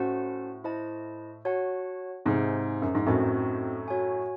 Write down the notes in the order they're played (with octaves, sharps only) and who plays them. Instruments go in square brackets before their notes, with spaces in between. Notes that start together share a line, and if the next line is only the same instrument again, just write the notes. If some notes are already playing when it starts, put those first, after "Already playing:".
Already playing: [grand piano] A2 [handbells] C#4 F#4 C5 F#5 A5
[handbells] E4 C5 D#5 A5
F#4 C#5 F#5 A5
[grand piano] G#2 C3 [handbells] D#4 G#4 C5
[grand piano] F#2
G#2
[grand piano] F#2 A2 [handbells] C4 D#4 F#4 C5 D#5
[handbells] F#4 C#5 G#5